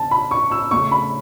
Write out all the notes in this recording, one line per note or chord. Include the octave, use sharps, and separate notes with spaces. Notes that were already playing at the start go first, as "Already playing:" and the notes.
Already playing: C#3 A5
B5
C#6
E6
C#3 A3 C#6
B5